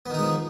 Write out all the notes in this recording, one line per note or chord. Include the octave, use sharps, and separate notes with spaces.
D#3 F3 G#3 B3 D#4